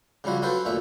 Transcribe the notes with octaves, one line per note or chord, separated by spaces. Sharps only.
C#3 F3 G3 E4 F#4
F#3 C#4 F#4 A4 B4 C5
D2 A#2 A3 E5